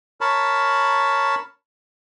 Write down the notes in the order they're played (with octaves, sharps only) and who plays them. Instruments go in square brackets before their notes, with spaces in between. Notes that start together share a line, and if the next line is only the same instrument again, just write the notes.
[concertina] A#4 C#5 A5 B5